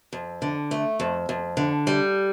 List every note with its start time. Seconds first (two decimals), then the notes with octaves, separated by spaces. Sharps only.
0.13 F2
0.42 D3
0.71 A3
1.00 F2
1.29 F2
1.57 D3
1.87 G3